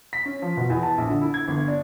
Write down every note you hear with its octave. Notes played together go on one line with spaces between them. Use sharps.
B6
C#4
F3
B2
E2
A5
A#1
D3
E4
G#6
G1
D4